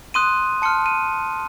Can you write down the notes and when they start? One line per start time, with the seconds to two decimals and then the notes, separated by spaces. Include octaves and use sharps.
0.14 C6 D#6 F#6 D#7
0.62 A5 C6 F6 C#7
0.86 D#7